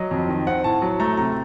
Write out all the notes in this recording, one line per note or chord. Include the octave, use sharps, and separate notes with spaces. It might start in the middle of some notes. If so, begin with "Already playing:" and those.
Already playing: F#3 D#5
F2
D#3
C4 F#5
A2 A5
F#3
A3 A#5
C3 A#5